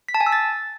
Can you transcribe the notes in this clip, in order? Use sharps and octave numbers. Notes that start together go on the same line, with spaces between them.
B6
A5
G#5
E6
A6